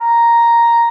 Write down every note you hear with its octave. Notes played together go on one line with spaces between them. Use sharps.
A#5